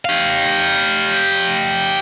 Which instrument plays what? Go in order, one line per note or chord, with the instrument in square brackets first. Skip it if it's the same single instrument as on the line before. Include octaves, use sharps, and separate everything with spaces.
[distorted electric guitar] G4 F5